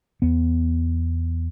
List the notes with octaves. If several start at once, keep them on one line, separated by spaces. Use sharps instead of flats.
E2 B3